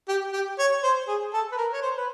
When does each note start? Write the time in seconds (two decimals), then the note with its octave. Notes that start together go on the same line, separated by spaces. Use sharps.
0.08 G4
0.33 G4
0.59 C#5
0.83 C5
1.08 G#4
1.34 A4
1.52 B4
1.58 A#4
1.73 C#5
1.82 C5
1.97 B4